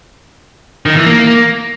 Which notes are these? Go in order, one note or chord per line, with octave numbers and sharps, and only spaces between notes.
D#3
E3
A#3